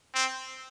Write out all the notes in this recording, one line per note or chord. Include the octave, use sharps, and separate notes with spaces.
C4